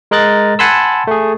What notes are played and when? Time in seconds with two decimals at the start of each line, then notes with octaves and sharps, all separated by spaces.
0.11 G#3 A#4 D#5 F#6 A6
0.59 F#5 G#5 A5 B5 C6 E6
1.07 A3 G#4